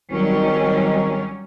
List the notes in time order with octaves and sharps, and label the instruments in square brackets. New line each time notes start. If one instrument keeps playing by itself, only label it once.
[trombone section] G#1 D#3 D#4 [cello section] F#3 G3 C#4